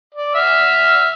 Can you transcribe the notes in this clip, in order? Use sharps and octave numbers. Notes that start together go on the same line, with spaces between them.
D5
E5 E6 F6